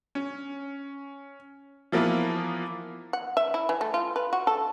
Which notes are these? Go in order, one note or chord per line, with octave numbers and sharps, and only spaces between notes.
C#4
E3 F3 A#3 B3 E4 F4
F#5
E5
E4
E3
A3
F4
B4
F#4
A4